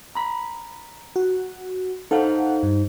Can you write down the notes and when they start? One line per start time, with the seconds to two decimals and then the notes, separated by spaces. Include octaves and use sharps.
0.15 A#5 B5
1.16 F#4
2.11 D#4 A4 C5 F5 F#5
2.63 G2